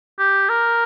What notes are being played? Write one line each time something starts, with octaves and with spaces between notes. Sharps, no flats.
G4
A#4